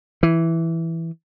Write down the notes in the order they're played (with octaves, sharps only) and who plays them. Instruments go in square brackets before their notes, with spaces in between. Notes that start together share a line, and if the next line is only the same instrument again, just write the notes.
[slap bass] E3